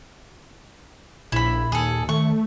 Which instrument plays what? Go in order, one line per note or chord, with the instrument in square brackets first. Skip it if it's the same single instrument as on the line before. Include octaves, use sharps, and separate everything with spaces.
[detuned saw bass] A#1 [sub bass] A#2 [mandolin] E4 B5
[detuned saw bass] D#2 [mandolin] G#4 A4
[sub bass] D#3 [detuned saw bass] A3 [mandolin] C#6